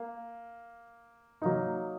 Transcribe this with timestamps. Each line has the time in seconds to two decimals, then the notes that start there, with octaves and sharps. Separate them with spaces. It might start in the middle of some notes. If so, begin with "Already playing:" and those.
Already playing: A#3
1.42 F#3 A#3 D#4